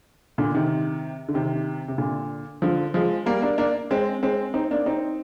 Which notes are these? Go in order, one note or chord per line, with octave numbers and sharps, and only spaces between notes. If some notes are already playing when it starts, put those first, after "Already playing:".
A#2 D3
C3 D#3
D3
C3 D#3
C3
A#2 D3
D3 F3
F3 G#3
G3 A#3
A#3 D4
A#3 D4
G#3 C4
G#3 C4
C4 D#4
A#3 D4
C4 D#4